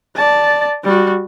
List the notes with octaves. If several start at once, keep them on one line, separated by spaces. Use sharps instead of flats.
D5 A5
G3 F#4